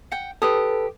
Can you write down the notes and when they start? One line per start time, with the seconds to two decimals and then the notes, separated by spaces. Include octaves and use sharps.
0.12 F#5 G5
0.42 G4 A4 B4 D#6